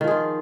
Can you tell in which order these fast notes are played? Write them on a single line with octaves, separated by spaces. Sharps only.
D#3 F3 G#4 F4